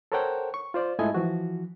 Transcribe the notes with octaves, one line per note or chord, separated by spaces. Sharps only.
A4 A#4 C5 C#5 F#5 G5
C#6
F4 C5 D5
G#2 A3 E4 F4 D#5 G#5
E3 F3 F#4